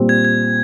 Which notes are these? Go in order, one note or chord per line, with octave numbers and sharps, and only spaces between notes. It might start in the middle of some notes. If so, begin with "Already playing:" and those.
Already playing: A#2 G3 C4
G#6
G#6